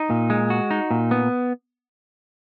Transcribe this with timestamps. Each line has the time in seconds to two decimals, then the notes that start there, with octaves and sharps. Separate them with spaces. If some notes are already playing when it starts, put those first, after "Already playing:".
Already playing: D#4
0.10 A#2
0.30 G#3
0.50 F#4
0.71 D#4
0.91 A#2
1.11 B3